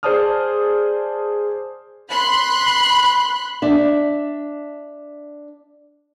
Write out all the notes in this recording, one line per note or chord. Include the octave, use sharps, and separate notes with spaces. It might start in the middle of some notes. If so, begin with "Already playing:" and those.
G#4 C5 D5 A5 D#6 F6
B5 C6 F#6
D4 E5